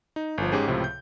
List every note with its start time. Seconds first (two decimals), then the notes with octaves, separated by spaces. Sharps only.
0.16 D#4
0.38 G1 F3
0.52 G#2 C#4 G4 G#4
0.67 C#2 A2 C3 F3
0.84 G6